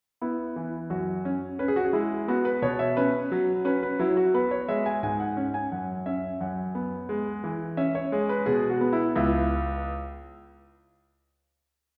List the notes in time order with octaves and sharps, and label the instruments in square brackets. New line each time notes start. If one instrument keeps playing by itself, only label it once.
[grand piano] B3 E4
E3
F#2 F#4
C#4
C#4 B4
G#4
F#4
G#4
G#3 E4
B3 F#4
B4
B2 C#5
E5
C#4 B4
F#3
C#4 B4
B4
F#3 E4
F#4
B3 B4
C#5
G#3 E5
G#5
G#2 G#5
F#5
C#4
G#5
F#2 F#5
C#4 E5
F#2 F#5
B3
G#3
E3
C#4 E5
C#5
G#3 G#4
B4
B2 G#4
F#4
B3
E4
C#2 E4